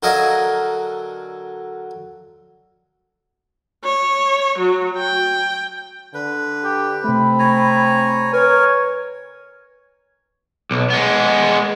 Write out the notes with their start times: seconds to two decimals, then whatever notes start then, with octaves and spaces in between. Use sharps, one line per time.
0.03 D3 F#3 A#4 D#5 F5 G#5
3.84 C#5
4.59 F#3
4.97 G5
6.14 D3 B4
6.64 G4
7.04 C3 A3 C4 B5
7.39 C#5 G#5 A#5
8.33 A#4 B4 C#5 G#5
10.71 B1
10.90 G#3 B3